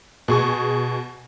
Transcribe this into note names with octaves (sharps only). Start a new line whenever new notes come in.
B2 G#4 C#6